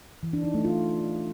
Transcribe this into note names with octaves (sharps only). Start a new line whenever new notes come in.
E3
D4
D#4
A3
F4